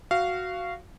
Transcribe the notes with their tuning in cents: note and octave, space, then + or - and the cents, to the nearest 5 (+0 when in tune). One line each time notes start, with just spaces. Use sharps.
F#4 +0 F5 -15